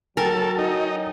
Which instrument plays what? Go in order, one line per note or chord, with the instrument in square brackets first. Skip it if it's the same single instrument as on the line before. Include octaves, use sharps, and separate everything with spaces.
[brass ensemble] F#3 [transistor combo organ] A4 [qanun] A#4 [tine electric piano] G5 G#5
[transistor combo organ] D#4